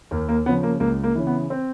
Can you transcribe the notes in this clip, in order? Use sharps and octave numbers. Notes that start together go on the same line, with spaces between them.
D#2 A#3
A#3
C#3 F3 B3
A#3
C#2 A#3
A#3
C#3 E3
B3
C4